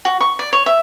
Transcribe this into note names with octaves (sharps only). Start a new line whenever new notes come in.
F#4
C#6
D5
C#5
E5